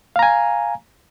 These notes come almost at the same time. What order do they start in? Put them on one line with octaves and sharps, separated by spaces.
F5 A#5 G#5